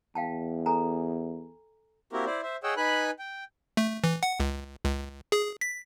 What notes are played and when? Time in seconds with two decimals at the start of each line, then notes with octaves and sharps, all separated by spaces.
0.15 E2 F5 G5 A5
0.66 A4 G#5 A#5
2.12 A#3 C4 E4 F#4 G4 A#4
2.26 E4 C5 D5
2.43 C5 E5
2.63 G#4 C#5 D#5 F#5 G5 E6
2.77 D#4 B4 G#5 B5 F#6
3.19 G5
3.77 A3
4.04 E3
4.23 F#5
4.40 C#2
4.84 C#2
5.32 G#4
5.61 B6